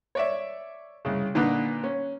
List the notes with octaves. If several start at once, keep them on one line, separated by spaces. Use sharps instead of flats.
C#5 D5 E5
C2 C#3
A#2 D3 D#4 B4
C#4